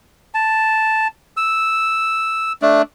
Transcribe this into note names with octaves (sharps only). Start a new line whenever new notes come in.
A5
E6
A3 D4